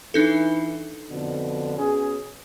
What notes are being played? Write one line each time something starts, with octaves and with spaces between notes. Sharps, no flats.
E3 D4 D#4 A4
F2 B2 D3
B2 C#4 G#4